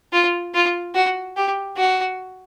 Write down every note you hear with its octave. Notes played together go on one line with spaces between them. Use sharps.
F4
F4
F#4
G4
F#4